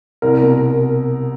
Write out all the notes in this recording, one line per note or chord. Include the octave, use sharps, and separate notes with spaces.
C2 A#4
B2